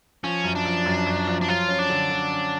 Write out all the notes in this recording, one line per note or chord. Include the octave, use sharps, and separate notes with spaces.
F3 C#4
F#2
D4
F3
F#2
F#2
F3
D4
F#3 F4
C#4
D4
D3
D3
C#4